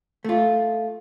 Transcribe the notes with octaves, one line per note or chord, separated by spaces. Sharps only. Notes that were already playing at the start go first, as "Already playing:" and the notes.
A3 F4